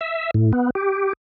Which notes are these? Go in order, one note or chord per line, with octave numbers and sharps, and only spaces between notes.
E5
A2
B3
G4